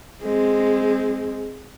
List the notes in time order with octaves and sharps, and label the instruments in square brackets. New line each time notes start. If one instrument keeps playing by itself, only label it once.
[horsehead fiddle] G#3 C4